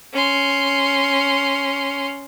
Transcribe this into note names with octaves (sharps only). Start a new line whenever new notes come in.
C#4 C6